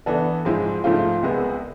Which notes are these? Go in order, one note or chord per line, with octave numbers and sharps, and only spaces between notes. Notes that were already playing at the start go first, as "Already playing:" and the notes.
E3 B3 D4 A4
G#2 F3 G#3 C4 E4
G#2 F3 A3 C4 F4
C2 C3 G#3 B3